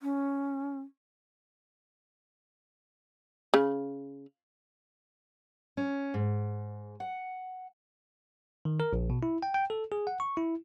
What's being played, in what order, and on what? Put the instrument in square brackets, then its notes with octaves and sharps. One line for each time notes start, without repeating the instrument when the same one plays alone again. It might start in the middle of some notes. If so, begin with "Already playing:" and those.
[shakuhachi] C#4
[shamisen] C#3
[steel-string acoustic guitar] C#4
G#2
F#5
[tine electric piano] D#3
A#4
A#1
B2
E4
G5
G5
A4
G#4
F#5
C#6
E4